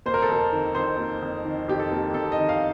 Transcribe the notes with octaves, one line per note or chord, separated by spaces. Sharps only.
A#3 C5
A#4
A4
F2 A#4
D#3
F2 C5
A#3
F2
D#3
F2 G4
A4
A#3
F2 A4
D#5
D#3
F5